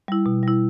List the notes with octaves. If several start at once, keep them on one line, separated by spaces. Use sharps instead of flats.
G3 E4
B2
G3 E4